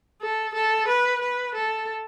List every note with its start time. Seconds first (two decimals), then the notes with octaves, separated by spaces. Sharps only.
0.22 A4
0.55 A4
0.88 B4
1.22 B4
1.55 A4